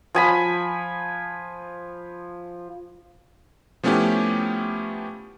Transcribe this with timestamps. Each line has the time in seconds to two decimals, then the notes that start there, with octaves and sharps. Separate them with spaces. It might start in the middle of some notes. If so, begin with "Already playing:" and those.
0.15 F3 G#5 B5
3.83 F3 A3 B3 C#4 E4 G4